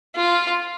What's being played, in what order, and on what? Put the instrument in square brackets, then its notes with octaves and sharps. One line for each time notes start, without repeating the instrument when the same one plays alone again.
[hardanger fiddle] F4